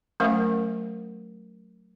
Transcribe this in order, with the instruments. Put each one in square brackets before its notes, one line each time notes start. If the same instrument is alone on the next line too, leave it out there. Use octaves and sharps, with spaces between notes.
[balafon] F#3 A3 C#4 A#4 F5 F#5